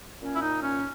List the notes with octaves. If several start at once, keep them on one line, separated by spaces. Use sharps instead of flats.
A#2 C#4
E4
D#4
C#4